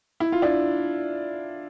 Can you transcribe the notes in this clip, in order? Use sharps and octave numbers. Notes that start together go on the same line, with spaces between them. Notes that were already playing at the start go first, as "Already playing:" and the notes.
E4
F4
D4 E4